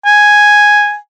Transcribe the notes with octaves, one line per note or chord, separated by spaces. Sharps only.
G#5